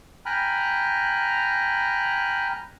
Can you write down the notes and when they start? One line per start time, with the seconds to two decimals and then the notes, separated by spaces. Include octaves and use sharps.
0.26 G5 G#5 A#5 B5 F6 F#6